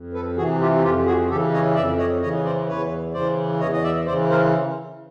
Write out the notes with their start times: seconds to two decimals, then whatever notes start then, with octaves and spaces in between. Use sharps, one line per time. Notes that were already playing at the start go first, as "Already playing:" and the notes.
Already playing: F2
0.13 A4 B4
0.36 C3 E3 F#4 G#4
0.61 F4 G4
0.83 F2 F4 G4
1.06 F#4 G#4
1.30 C#3 E3 G4 A4
1.53 C#5 D#5
1.75 F2 D5 E5
1.98 C#5 D#5
2.22 C#3 E3 C#5 D#5
2.44 C5 D5
2.68 E2 B4 C#5
3.14 C#3 E3 C5 D5
3.60 E2 C#5 D#5
3.73 D#5
3.83 D5 E5
4.06 C#3 C5 D5
4.12 E3
4.29 A#4 C5